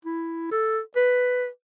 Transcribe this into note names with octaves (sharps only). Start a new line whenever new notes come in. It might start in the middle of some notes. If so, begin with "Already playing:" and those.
E4
A4
B4